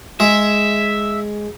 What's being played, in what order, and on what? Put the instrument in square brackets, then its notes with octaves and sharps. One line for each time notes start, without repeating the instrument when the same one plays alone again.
[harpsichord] G#3 G#4 [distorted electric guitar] E5